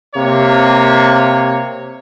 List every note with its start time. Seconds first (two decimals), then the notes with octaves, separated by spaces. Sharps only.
0.15 C3 A#3 C#5